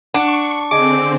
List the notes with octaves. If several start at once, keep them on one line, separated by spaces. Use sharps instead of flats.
D4 F#5 C#6
D3 C4 G#4 D#5 G#5 D6